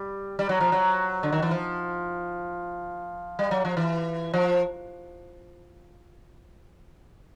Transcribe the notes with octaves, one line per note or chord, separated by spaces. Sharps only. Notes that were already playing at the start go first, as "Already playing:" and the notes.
Already playing: G3
G3
F#3
F3
F#3
D3
D#3
E3
F3
G3
F#3
F3
E3
F3